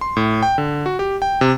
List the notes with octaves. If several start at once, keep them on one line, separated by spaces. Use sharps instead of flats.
C6
A2
G5
D3
F#4
G4
G5
C3